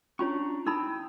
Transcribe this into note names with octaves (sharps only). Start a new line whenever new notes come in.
C#4 D4 F4 C#5 A#5 C#6
D#4 E4 G5 B5 D#6 E6